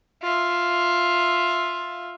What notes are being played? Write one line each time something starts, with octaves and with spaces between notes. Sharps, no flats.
F4 E5